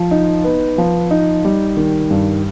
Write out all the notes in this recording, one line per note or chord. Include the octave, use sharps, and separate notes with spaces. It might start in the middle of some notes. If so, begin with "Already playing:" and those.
Already playing: F3
D#4
B3
F3
D#4
G3
D#3
G2